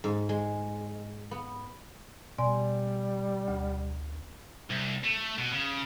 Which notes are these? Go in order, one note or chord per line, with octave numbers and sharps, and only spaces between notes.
G#2
G#3
B3
B2 G3 D5 G#5 C6
D2
C2
A3
B2
C#3